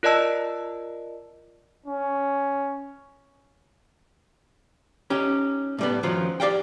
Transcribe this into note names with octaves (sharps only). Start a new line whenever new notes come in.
F4 A#4 D5 D#5 A5 E6
C#4
C#4 D#4 G4
A2 G3 B3
F#2 D#3 F3 F#3 F4
G4 D5 F5 G5